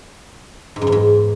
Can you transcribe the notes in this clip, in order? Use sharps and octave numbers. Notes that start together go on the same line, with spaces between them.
G#2
F#2
E2
G#2